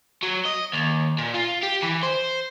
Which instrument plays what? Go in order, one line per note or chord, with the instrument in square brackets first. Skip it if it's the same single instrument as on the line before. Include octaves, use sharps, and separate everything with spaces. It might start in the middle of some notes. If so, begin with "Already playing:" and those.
[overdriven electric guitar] F#3
D#5
D#2
A#2
F4
G4
E3
C5